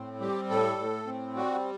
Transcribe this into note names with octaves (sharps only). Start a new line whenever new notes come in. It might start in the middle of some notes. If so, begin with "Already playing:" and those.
Already playing: A2 C4
G3 G4
A2 A4
A2
C4
G3 F#4